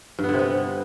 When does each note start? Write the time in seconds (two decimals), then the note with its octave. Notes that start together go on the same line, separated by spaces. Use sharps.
0.19 G2
0.24 B3
0.29 D3
0.34 C3
0.39 B3